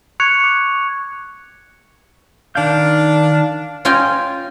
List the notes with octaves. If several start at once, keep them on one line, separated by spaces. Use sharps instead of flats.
C#6 F#6 G#6 C#7 F7
D6
D#3 D4 F5 G6
C#4 F4 D#5 F5 G5 G#5